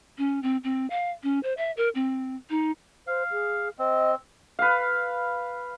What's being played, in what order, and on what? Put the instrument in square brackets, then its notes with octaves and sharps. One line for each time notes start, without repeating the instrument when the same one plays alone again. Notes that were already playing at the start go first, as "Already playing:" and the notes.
[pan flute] C#4
C4
C4
F5
C#4
C5
E5
A#4
C4
D#4
[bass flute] C5 [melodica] F5
[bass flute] G#4
[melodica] C4 [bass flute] D#5
[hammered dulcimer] B4 F5